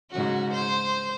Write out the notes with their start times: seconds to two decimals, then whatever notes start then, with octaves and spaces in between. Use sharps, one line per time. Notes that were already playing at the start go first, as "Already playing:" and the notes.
0.11 G#2 C#3 F#4
0.53 C5